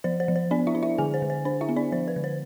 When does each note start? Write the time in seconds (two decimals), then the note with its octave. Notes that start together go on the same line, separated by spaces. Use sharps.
0.04 F3 C5
0.20 C5
0.28 F3
0.36 C5
0.51 B3 D4 D5
0.67 E4 E5
0.75 D4
0.83 E4 E5
0.98 D3 G#4 G#5
1.14 C5
1.22 D3
1.30 C5
1.45 D4 C5
1.61 E4 E5
1.69 B3
1.76 D4 D5
1.92 F3 C5
2.08 B4
2.16 D3
2.24 C5